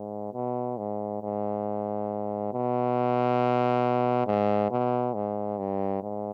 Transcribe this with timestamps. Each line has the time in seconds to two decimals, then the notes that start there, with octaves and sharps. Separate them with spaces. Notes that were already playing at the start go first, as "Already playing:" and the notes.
Already playing: G#2
0.34 B2
0.78 G#2
1.22 G#2
2.53 B2
4.27 G#2
4.71 B2
5.14 G#2
5.59 G2
6.03 G#2